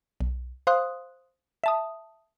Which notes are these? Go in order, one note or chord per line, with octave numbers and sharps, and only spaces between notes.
B1
C5 F5 C6 D#6 F#6
E5 A5 D#6